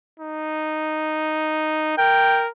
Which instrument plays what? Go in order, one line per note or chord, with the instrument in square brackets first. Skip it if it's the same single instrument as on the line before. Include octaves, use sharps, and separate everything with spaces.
[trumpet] D#4
[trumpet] A#4 [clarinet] G5